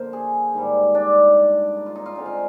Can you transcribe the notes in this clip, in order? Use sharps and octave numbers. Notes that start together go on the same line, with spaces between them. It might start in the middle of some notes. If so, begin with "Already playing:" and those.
Already playing: D3 F3 A#3 A#4 C5
G#4
G#2 D#3 G3
D4
D#4
F4
D#4
F4
D3 G#3 C4 D#4
F4